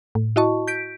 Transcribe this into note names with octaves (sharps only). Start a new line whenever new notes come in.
A2
E4 F#4 D#5 A5 C#6
G6 B6 D7